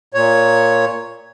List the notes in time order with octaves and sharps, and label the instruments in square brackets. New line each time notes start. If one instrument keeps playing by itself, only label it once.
[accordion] A#2 C#5